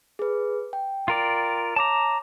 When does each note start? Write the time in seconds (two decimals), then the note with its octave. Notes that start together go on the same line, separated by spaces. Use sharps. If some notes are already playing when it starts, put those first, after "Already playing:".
0.19 G#4 B4
0.73 G5
1.08 F4 A#4 D5
1.76 C#5 A5 A#5 D6